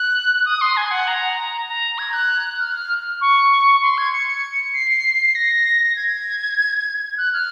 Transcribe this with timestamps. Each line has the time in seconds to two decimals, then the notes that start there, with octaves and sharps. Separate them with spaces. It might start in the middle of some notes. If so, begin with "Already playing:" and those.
Already playing: F#6
0.45 D#6
0.61 C6
0.77 G#5
0.91 F#5
1.07 A#5
1.68 A#5
1.98 G#6
2.13 F#6
2.60 F6
3.21 C#6
3.82 C6
3.98 G#6
4.13 C#7
4.27 C#7
4.73 C7
5.26 C7
5.35 A#6
5.84 A#6
5.96 G#6
7.18 F#6
7.33 F6